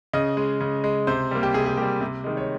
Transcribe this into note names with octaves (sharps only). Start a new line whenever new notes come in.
C#3 D#5
G#3
C#3
G#3
C3 C5
G3 A#3
G4
C3 G#4
G#4
G3 A#3 G4
C3
D#3 G#3
C#5